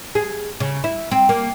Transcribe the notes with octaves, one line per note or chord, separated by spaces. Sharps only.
G#4
C#3
E4
C4
A#3